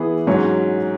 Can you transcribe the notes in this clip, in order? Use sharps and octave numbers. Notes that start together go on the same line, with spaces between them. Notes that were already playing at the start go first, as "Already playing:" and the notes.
Already playing: E3 B3 E4 G#4
G#2 F#3 C#4 F#4